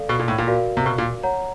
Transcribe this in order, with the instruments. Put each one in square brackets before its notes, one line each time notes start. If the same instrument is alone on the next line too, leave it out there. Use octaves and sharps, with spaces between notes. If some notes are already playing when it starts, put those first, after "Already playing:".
Already playing: [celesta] A4 D5 F5
[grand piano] B2
A#2
A2
A#2
[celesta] F#4 A#4 D5 F5
[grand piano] C3
B2
A#2
[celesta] C#5 F#5 A#5